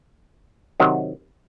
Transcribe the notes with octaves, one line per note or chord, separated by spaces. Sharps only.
C3 D#3 F#3